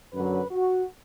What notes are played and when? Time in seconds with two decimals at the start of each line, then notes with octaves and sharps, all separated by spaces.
0.14 F#2 D3 F#3 B4
0.51 F#4